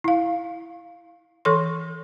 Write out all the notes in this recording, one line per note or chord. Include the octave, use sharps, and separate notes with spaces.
E4 F5
E3 A4 C#5 C6